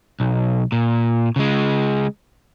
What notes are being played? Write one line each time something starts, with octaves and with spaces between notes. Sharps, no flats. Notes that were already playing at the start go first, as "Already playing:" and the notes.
B1
A#2
C#3 G#3